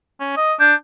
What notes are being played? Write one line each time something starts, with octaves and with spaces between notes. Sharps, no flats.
C#4
D#5
D4 G6